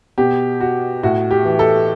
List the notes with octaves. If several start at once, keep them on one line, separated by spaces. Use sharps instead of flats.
B2 G4
F#4
A2 F#4
G4
E3
A4